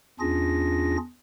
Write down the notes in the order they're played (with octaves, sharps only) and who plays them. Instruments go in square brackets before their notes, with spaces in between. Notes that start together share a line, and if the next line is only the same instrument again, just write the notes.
[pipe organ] E2 C#4 D4 F4 G#4 A#6